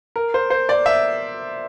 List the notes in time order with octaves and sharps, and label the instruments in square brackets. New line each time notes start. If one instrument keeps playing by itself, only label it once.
[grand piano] A#4
C5
C5
D5
E5